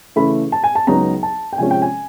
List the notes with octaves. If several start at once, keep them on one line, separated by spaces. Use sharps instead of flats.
C#3 E3 A3 B5
A5
G#5
A5
C#2 C#3 F#3 B3 D#4 A#5
A5
G5
C3 F3 G#3 C#4 G#5
G5
G#5